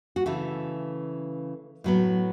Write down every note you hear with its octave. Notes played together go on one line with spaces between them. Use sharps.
F#4
C#3 E3 A3 A4
A2 F#3 B3